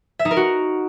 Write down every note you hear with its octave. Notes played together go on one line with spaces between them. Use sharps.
E5
D#4
A#4
F#4